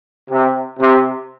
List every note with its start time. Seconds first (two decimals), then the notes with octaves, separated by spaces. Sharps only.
0.31 C3
0.80 C3